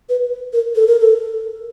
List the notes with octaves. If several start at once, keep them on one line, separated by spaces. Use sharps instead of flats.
B4
A#4
A4
A#4
A4